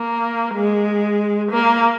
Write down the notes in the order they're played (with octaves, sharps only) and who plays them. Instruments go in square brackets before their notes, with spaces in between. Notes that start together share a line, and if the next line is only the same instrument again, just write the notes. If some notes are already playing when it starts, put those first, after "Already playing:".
Already playing: [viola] A#3
G#3
A#3